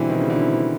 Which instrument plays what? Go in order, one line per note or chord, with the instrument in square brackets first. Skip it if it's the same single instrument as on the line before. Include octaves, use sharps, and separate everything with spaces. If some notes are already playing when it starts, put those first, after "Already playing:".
Already playing: [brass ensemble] B2 G3 C4 E4 [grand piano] D3 E3
[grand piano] D#3
C#3
D3